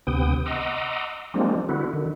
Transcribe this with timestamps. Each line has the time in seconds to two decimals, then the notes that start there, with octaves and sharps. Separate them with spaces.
0.07 D2 C3 B3 G5 D#6
0.46 D#5 F#5 A#5 C6 D6 E6
1.34 F3 G3 G#3 A#3 C4 D4
1.69 D3 B3 E4 F#4
1.93 D3 D#3